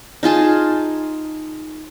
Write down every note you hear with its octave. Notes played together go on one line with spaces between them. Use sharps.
D#4 F4 G#4 A5